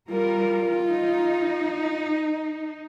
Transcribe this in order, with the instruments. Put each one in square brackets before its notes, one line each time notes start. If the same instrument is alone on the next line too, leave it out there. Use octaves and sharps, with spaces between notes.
[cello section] G3 A#4 [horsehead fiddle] F4
[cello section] D#4